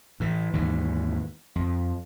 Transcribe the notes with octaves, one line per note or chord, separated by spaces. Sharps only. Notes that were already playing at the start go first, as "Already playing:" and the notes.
A2 E3
D#2 G#2 E3
F2